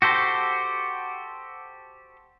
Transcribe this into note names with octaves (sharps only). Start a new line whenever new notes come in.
F#4 G4 A4 C5